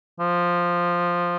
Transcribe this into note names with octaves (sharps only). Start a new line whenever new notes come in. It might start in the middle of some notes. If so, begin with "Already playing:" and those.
F3